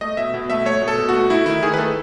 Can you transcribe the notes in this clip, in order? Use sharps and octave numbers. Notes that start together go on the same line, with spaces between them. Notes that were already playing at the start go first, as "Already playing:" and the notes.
A3 D#5
B2 E5
B2
A3 E5
A3 C#5
B2
A4
B2
F#4
A3
A3 E4
D#3 E4
D#3 G#4
B4
A3 A4